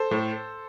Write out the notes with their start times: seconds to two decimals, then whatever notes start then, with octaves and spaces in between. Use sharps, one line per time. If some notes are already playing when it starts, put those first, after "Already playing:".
Already playing: A4 C5
0.11 A2